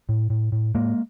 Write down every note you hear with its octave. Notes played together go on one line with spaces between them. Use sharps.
A2
A2
A2
A2 G#3 A#3